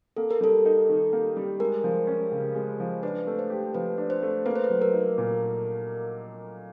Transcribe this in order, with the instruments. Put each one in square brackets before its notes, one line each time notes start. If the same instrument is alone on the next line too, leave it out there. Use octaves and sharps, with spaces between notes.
[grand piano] A#3 [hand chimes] A4
[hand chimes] A#4
[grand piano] G3 [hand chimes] A4
[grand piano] D#4
D#3
A#3
G3
[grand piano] G#3 [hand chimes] A#4
[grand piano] F3
C#4
C#3
G#3
F3
[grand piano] D4 [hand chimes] B4
[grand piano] A3
[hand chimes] C5
[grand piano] G4
[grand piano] F3 [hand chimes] B4
[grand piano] D4
[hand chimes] C5
[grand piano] A3
[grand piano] A#3 [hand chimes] B4
[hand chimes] C5
B4
[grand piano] F#3
[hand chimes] A#4
[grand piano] D#4
A#2